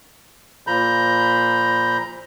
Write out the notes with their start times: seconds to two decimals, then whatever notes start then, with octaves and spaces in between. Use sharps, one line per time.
0.67 A#2 F3 A#5 B5 G6